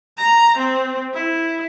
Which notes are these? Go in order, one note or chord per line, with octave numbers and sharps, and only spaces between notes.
A#5
C4
E4